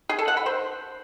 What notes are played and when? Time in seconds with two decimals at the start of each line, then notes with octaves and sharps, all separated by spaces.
0.09 G#4
0.19 A4
0.28 F#5
0.37 B5
0.46 C5